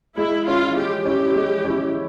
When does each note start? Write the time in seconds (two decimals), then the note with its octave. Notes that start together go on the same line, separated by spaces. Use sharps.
0.17 G#3 E4
0.47 C#4 E4 F4
0.76 G#3 G4
1.05 C#4 E4 G4
1.35 G#3
1.65 C#4 E4